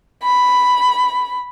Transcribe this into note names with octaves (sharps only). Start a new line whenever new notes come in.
B5